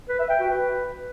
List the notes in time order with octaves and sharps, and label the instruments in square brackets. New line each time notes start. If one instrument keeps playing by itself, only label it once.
[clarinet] B4
E5
G5
F#4
B4